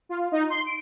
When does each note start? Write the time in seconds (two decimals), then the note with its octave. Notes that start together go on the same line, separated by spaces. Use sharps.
0.09 F4
0.32 D#4
0.50 C6
0.65 D7